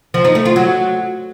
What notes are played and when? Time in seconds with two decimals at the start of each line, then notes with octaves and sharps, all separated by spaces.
0.14 F3
0.25 D#4
0.35 A3
0.45 F4
0.56 F#3